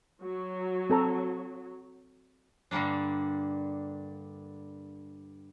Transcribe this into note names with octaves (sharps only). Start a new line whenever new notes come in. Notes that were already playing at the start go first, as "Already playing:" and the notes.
F#3
C4 A4 A#5
G2 D3 G3 A#3 D4